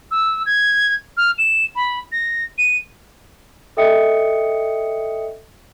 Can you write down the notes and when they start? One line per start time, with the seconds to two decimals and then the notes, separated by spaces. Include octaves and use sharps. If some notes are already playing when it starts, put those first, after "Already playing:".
0.11 E6
0.46 G#6
1.17 F6
1.38 E7
1.76 B5
2.12 A#6
2.58 D#7
3.77 A4 D#5 E5 G5 D#6 C#7